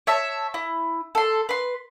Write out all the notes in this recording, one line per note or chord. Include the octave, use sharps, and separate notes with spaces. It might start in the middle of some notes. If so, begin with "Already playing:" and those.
C#5 E5 A5
E4
A4 C6
B4 C6